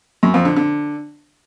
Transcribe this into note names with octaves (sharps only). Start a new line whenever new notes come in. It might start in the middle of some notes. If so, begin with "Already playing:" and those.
F#2
F2
D3
D3